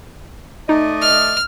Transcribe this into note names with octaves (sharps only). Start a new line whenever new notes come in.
A3 D#4 D5 D#5
F6